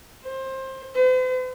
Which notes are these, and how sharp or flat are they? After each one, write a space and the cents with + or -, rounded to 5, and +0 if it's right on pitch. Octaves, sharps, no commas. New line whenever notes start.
C5 +20
C5 -45